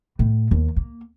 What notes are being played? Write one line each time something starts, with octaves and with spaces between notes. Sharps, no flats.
A2
D#2
A#3